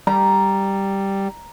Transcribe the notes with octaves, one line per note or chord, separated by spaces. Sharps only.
G3 A#5